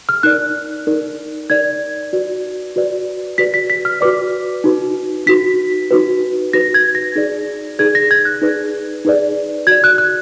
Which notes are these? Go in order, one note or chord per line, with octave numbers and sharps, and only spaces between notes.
F6
D#4 A#4 D5 F#6
D#4 A#4 D5
D#4 A#4 D5 G#6
F#4 B4 D5
F#4 B4 D5
F#4 B4 D5 B6
B6
B6
F6
F#4 B4 D5 D6
D#4 F#4 B4
D#4 F#4 B4 B6
D#4 F#4 B4
D#4 F#4 B4 A#6
G#6
A#6
D#4 G#4 B4 D5
D#4 G#4 B4 D5 G#6
A#6
G#6
F#6
D#4 G#4 B4 D5
D#4 G#4 B4 D5
F#4 D5 G#6
F#6
F#6